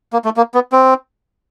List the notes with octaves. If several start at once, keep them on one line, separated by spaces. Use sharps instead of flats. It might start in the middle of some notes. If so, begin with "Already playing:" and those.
A#3
A3
A#3
B3
C4